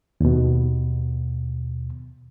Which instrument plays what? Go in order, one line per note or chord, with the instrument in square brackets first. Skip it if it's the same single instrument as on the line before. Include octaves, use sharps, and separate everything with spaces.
[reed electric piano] D#2 B2